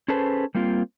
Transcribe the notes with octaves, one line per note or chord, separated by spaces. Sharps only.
C#4 G#4 A4 B4 C5 A5
G3 A#3 C4 F4